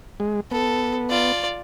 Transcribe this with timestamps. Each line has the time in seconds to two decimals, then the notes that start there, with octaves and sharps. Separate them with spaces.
0.20 G#3
0.51 B3 A4
1.09 F4 D5